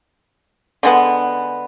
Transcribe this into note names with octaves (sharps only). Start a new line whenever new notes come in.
D3 G#3 B3